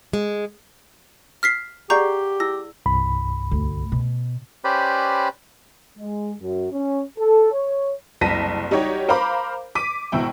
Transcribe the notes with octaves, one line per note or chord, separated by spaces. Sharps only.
G#3
F6 B6 C7
G4 G#4 D5 F#5 A#5 C#6 G6
E4 E6 A#6
C2 G2 B5
D2
B2
C#4 G4 B4 C5 D5 B5
G#3
F#2
C#4
A4
C#5
F#1 C2 A5 A#6 B6 D#7
G3 D#4 F#4 G4 C#5
A#4 C5 F5 A#5 B5 D6
D6 B6 D#7
G#1 B2 E4 G5